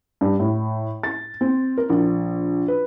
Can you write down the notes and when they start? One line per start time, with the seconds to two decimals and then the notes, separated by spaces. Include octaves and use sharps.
0.21 G2
0.40 A2
1.03 A6
1.41 C4
1.78 A#4
1.90 A#1
2.68 B4